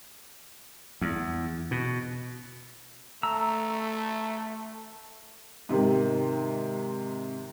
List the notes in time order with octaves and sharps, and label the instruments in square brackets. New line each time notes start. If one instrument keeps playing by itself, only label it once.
[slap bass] E2
B2
[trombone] A3 [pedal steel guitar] A#5 E6
[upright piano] G#2 C3 D#3